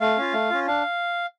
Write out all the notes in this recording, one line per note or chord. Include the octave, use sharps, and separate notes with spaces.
A3 F5
C#4 F4
A3
C#4 F4
D4 F5